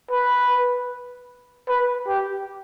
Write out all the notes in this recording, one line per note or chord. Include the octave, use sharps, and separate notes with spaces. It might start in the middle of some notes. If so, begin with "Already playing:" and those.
B4
B4
G4